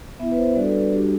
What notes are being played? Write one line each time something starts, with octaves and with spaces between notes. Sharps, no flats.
B3 E4 E5
B4
C5
G3 D4 F#4 D5
A4
B4
A4
G3 D4 F#4 G4